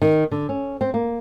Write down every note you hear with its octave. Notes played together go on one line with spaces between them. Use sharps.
D#3
D3
C#4
C4
A#3